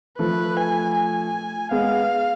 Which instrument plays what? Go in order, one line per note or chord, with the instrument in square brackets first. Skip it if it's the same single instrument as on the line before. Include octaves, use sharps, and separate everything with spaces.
[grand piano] F3 A3 [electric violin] B4
[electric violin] G#5
G#5
[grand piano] G#3 B3 [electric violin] F5